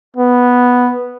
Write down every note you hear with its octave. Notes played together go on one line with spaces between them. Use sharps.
B3